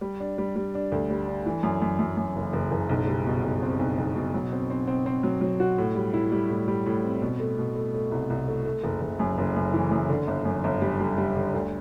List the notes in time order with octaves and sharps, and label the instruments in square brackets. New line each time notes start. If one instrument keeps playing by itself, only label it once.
[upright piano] G3
D4
G3
G3
D4
D2
G3
D4
E3
F#2
F#2
F#2
F#2
F#1
F#1
F#1
B1
G3
B2
B1
C4
B1
B1
B2
F#3
C4
C4
C4
C4
F#3
F#3
F#4
A2
G3
E4
G3
A2
G3
A2
C4
B2
A3
B2
A3
A3
C2
C2
A3
A3
F#1
F#1
F#2
F#1
F#2
E3
F#2
D3
G1
F#2
G1
G3
G3
G3
D3
D2